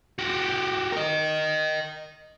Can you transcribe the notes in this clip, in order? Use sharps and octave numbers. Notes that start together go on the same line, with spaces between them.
F#4 G4
A#4 D#5